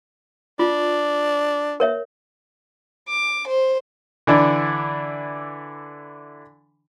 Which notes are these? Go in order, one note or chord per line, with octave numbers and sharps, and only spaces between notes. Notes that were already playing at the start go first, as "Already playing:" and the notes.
D4 F4
A#4 C#5 E5
D6
C5
D3 E3 D4 E4